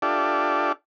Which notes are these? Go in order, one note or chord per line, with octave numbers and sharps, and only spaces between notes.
D4 F4 G4 A4 D5 E5